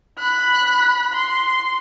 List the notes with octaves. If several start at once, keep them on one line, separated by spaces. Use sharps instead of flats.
B5 F#6
C6